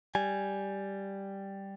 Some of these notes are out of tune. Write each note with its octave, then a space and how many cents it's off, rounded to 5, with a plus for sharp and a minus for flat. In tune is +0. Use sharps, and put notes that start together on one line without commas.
G3 +0 G#5 +0